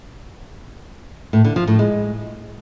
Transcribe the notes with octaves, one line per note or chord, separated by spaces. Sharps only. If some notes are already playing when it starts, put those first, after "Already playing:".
A2
D3
F3
A2
G#3